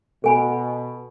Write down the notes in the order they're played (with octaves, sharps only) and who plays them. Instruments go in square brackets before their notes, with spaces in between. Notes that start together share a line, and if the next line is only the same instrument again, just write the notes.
[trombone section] B2 [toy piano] A4 G#5 B5